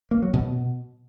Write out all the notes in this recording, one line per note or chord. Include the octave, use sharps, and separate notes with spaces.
A#3
F#3
B2